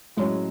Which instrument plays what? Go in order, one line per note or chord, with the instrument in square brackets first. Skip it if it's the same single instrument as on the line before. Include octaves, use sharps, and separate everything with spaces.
[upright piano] A2 F#3 C#4 [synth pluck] G#3